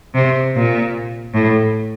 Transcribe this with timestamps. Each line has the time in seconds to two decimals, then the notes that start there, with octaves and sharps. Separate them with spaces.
0.14 C3
0.54 A#2
1.33 A2